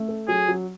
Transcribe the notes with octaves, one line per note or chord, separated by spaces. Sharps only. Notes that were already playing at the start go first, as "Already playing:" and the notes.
Already playing: A3
A4
F#3 G#4
F#3